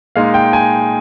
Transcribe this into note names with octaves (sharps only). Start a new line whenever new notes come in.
A#2 G#3 D#4 F5
G5
G#5